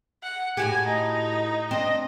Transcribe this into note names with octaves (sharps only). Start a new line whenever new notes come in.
F#5
A2 F#4 G4 G#5
D#4
C4 D4 D#5